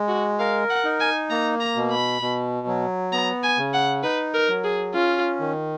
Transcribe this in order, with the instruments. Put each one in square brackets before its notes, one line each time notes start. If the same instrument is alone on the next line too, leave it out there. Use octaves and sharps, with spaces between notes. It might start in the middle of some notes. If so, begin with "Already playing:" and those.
Already playing: [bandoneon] G#3
[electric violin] F#4
[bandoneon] A#4 [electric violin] F5
[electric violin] F#5
[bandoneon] D#4
[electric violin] G#5
[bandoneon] A#3 [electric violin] A#5
[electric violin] A#5
[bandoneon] B2
[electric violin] B5
[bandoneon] B2
F#3
[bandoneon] B3 [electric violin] A#5
[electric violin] G#5
[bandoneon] C#3
[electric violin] F#5
[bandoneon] D#4 [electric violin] B4
[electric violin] A#4
[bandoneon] F#3
[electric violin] G#4
[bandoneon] C#4 [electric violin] F4
[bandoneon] D#3